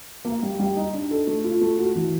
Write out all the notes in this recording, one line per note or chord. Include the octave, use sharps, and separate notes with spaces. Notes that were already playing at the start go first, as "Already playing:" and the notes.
A#3
G3
G3
D#4
D4
A4
A3
F4
A3
F#4
E3